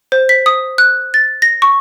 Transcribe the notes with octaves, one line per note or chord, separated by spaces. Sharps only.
C5
B6
D#6
F#6
A6
A#6
C#6